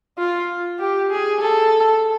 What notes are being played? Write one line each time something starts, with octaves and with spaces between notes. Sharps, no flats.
F4
G4
G#4
A4